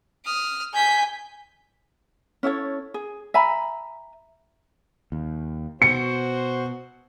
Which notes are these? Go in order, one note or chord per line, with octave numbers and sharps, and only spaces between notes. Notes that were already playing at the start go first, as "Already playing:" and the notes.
D#6 F6
G#5 G6 B6
C#4 E4 A4 C#5
G#4
E5 G#5 A#5 B5
D#2
B2 F#4 C5 C#7